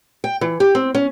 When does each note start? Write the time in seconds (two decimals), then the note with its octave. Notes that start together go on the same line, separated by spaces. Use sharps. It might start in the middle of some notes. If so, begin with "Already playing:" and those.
0.24 G5
0.41 E3
0.60 G4
0.75 C4
0.95 C#4